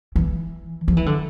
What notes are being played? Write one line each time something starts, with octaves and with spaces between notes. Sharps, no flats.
E3
F3
E3
D3